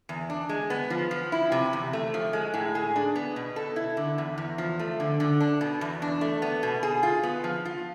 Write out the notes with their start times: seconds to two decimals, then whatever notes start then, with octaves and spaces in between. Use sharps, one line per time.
0.09 E2
0.30 D4
0.49 G#3
0.70 B3
0.90 F3
1.11 F3
1.32 E4
1.52 C3
1.73 E2
1.93 A3
2.14 F3
2.33 G#3
2.54 A2
2.75 G#4
2.96 D4
3.16 B3
3.36 B2
3.56 A4
3.76 E4
3.97 D3
4.18 E2
4.38 E2
4.58 F3
4.79 A3
5.00 D3
5.20 D3
5.41 D4
5.61 B2
5.81 E2
6.02 D4
6.21 A3
6.42 B3
6.63 B2
6.83 G#4
7.03 F4
7.23 B3
7.44 F3
7.65 F4